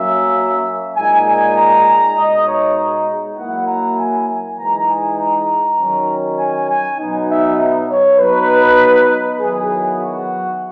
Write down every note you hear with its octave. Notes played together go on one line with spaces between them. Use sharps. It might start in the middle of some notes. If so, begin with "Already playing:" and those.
Already playing: F#3 A#3 C#4 E5
A#2 G#3 D#4 G#5
G#5
A#5
B2 G#3 D#4 D#5
C#5
F#3 A#3 E4 F#5
A#5
G#5
G#5
E3 G#3 D#4 A#5
G#5
A#5
D#3 F#3 C#4
G#5
G#5
B2 F#3 B3 D#4
E5
C#5
F#3 B3 D#4 B4
D#3 F#3 B3 E4 G#4
F#4